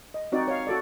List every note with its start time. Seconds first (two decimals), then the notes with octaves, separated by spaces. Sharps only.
0.14 D#5
0.32 C4 D#4 F#4 D5
0.48 C#5 F5
0.67 F#4 A4 D5